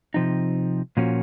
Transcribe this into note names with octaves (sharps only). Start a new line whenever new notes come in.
C3 F3 C4 D#4
A#2 F3 A#3 C#4 F#4